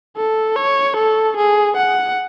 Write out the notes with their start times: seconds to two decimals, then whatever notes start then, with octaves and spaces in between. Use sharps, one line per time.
0.17 A4
0.56 C#5
0.97 A4
1.36 G#4
1.77 F#5